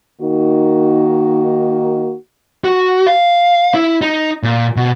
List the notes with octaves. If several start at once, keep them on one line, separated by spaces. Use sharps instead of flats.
D#3 A#3 D#4 F#4
F#4
F5
E4
D#4
A#2
B2